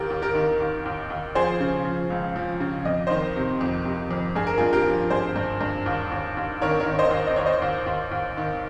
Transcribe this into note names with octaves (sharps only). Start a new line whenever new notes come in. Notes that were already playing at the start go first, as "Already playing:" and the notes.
Already playing: D#2 G4 A#4
D#2
G4 A#4
D#3
D#2
D#2
D#2
F3 G#4 C5
C#3
F3
C#2
F3
C#3
F2 D#5
D#3 C5 D#5
C3
F2
C3
F2
G2 G#4
A#4
G2 F4 G#4
G4 A#4
F3
G2 G#4 C5
G2
G2
D#2
D#2
D#2
D#3 A#4 C#5
A#4 C#5
D#3
C5 D#5
D#2
D#5
D#2 C#5
C5 D#5
D#2
D#2
D#2
D#3